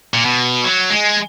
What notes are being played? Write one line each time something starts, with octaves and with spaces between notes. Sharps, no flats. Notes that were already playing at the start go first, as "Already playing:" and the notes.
A#2
B2
F#3
G#3